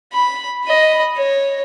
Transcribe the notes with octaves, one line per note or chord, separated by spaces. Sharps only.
B5
D#5 B5
C#5